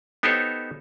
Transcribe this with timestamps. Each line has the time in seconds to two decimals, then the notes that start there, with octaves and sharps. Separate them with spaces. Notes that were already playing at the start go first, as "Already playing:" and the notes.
0.23 B3 D#4 G4 A4 C5 C#5